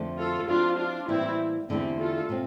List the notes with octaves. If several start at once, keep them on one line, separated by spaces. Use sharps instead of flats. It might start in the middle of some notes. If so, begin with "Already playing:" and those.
Already playing: F2 D3 F3 A3
F4 A4
F3 C4 D4 E4 F4
D4 F4
A2 E3 G3 A#3 C4 E4
E2 D3 A3 C4 E4 G4
F4 A4
A#2 A3 C4